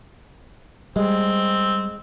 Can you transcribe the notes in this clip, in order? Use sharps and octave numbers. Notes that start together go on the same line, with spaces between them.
G3 G#3 C4